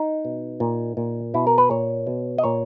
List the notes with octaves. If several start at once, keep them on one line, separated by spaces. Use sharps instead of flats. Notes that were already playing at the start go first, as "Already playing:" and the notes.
Already playing: D#4
B2
A#2
A#2
B2 E4
A#4
B4
A#2 C#5
B2
D#5
A#2 C#5